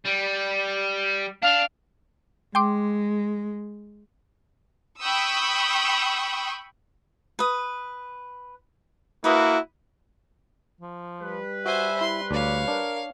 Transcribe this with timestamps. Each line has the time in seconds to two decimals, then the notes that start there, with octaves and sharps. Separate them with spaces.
0.05 G3
1.42 D4 F5
2.55 G#3 G5 C6 D6
5.00 G5 B5 C#6 D#6 E6
7.39 B4 D#6
9.24 A#3 E4 F#4 B4 D#6
10.81 F3
11.21 G3 B4
11.66 F#4 C5 E5 G#5
12.01 E4 C6
12.31 D2 C#5 D5 F5
12.68 D4 A#4